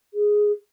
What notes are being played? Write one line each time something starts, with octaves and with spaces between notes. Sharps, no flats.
G#4